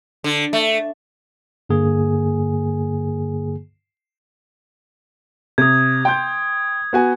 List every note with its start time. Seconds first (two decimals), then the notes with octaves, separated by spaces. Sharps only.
0.24 D3
0.53 A3
1.69 G2 D3 A#3 G#4 G#5
5.58 C3 D#6 G#6
6.05 G5 C6 G6
6.93 B3 F#4 G#5